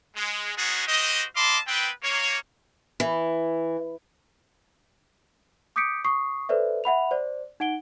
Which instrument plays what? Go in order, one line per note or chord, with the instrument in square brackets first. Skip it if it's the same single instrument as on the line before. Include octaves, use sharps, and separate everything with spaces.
[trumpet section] G#3
G#3 B3 C#4 D#4 F#4 G#4
F#4 G4 C5 D#5
D#5 F5 A5 B5 C6 D6
B3 C4 B4 G5
A#3 C#5
[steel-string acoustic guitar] E3
[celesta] D6 D#6 G6 B6 C#7 D7
C#6 D#6 C7
A4 B4 C5 D5 E5
E5 F#5 B5 F7
C5 D5
D#4 F#5 D7 G7